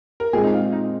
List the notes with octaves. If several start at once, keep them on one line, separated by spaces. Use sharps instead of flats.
A#4
A#2 G#3 C4 G#4
D#4
F4
D#4